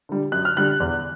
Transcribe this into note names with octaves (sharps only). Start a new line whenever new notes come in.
D3 G3
F#2 F#6
F6
D3 G3 F#6
E2